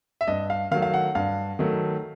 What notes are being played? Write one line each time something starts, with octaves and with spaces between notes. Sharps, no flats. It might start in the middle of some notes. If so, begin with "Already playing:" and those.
E5
G2 D#5
F5
D#3 F#3 A3 F5
F5
F#5
G2 F5
D#3 F#3 A3